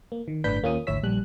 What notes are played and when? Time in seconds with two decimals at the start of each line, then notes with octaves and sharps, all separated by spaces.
0.12 A#3
0.28 D#3
0.44 G1 A2 D4 B4 G6 B6
0.63 D#2 A#3 C#4 F4 D#6
0.87 G#1 D2 E4 C#5 E6 B6
1.03 A#1 G3 F#6